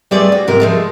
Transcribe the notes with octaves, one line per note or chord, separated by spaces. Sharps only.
G3 A3 C4 G#4 B4 D5
F#4
G#2 C3 A#4
F3 G#3 A3